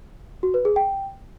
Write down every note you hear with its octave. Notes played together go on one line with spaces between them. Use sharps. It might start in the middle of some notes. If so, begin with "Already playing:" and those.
F#4
B4
G#4
G5